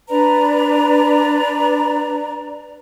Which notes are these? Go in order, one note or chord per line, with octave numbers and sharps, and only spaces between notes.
D4 B4 D5 A#5